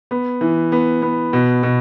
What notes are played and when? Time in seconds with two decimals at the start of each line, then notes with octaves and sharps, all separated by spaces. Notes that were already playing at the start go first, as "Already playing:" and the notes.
0.11 B3
0.41 E3
0.72 B3
1.02 B3
1.33 B2
1.63 B2